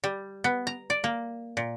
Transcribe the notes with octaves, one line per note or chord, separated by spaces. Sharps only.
G3
B3
A#5
D5
A#3
A#2